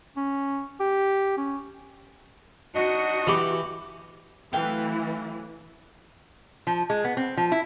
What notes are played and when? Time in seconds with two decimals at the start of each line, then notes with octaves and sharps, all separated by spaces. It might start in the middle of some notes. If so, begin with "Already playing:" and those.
0.17 C#4
0.80 G4
1.37 C#4
2.75 D4 D#4 F#4 D#5
3.27 E3 G4
4.53 E3 F#3 A3 C4 F5 G5
6.67 F3
6.90 G#3
7.04 B3
7.17 C4
7.37 F3
7.52 E4